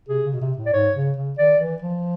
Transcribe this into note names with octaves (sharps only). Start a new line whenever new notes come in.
C3 G#4
C#3
B2
C3
A2
D5
G#2 C#5
C#3
C#3
D#3 D5
E3
F3